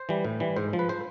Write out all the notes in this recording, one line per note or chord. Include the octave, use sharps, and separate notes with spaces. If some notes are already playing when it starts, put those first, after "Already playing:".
Already playing: C5
E3 G3
A2
E3 G3
G#2 C5
F3
B4
C5